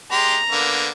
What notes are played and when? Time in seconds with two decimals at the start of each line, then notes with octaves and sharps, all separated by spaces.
0.12 G#3 G4 A#5 C6
0.52 D3 A#3 B3